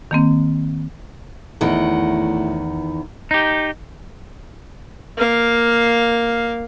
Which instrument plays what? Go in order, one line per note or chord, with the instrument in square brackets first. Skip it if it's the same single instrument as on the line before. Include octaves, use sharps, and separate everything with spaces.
[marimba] D#3 A#3 C4
[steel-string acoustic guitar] E2 D#3 F#5 [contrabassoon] A2
[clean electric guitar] D#4 G4
[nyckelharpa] A#3 F5